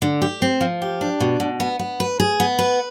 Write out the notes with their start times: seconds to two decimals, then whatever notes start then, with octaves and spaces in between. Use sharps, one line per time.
0.02 D3
0.22 G4
0.42 C4
0.61 F3
0.82 G4
1.01 D4
1.20 B2
1.40 B2
1.60 B3
1.79 B3
2.00 B4
2.20 G#4
2.40 B3
2.59 B4